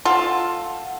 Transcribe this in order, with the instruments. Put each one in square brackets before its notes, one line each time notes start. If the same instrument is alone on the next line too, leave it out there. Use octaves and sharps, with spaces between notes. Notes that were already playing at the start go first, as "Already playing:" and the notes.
[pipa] F4 A4 [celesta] F#5